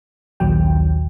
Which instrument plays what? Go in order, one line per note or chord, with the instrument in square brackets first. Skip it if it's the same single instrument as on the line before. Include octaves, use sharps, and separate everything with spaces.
[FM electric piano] A#1 D#2 F#3 G5